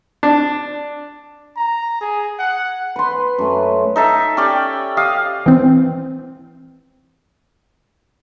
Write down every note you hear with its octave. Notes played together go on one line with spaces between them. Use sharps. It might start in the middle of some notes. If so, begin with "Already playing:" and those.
D4
A#5
G#4
F#5
B4 C6
F#2 A3
D#4 A4 E5
C#4 G4 D5 G5
G4 D#5 F5 D#6
E3 C4